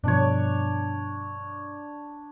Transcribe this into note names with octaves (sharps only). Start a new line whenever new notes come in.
G2 B2 F3 D4 C#5